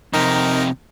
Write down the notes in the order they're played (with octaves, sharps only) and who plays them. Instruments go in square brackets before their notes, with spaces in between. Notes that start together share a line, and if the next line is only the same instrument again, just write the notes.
[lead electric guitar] F2 C3 [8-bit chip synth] D#4 A#4